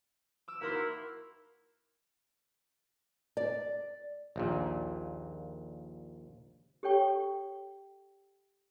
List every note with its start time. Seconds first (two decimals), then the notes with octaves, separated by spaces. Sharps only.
0.48 D6 E6
0.61 A#3 D#4 E4 F#4 A#4 C6
3.37 D5
4.36 A#1 D#2 A#2
6.83 G4 A4 C#5 G5 C#6